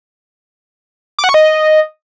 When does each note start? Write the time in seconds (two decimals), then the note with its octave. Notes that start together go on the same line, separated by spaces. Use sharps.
1.19 D6
1.24 F#5
1.29 C#6
1.34 D#5